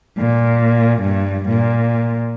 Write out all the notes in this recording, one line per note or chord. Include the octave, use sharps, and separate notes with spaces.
A#2
G2
A#2